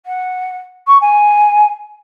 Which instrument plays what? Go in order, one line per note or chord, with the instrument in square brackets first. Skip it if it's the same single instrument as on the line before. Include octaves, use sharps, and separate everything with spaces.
[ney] F#5
C#6
G#5